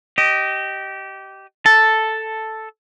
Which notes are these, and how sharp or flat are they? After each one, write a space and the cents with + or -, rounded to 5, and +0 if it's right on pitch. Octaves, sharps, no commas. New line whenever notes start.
G4 -20 D#5 +0
A4 +0 A5 +0